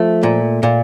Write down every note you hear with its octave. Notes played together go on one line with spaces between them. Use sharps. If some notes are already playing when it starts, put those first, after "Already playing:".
Already playing: F3 A3
A#2
A#2